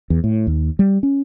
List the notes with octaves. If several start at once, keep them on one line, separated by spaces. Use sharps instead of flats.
E2
A2
D#2
G3
C#4